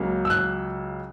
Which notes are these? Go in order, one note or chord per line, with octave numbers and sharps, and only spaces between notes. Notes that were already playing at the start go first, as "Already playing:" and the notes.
Already playing: C#2 C#3 F#3 A#3
E6
F#6